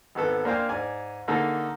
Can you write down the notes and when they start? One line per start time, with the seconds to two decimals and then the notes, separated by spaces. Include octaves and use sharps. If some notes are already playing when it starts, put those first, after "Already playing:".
0.15 G#1 G#2 B3 A4
0.45 A#3 D4 C5 F5 G5 G#5
0.69 G#2 D5 G#5
1.28 D3 A#3 D#4 G#4 A4